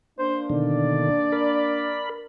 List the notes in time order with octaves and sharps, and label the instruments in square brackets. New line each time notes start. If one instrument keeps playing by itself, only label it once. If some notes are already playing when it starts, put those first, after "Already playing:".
[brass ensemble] A#3 D4 [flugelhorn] C5
[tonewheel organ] B2 D3 D#3 [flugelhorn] D5
[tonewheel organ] A#4 B5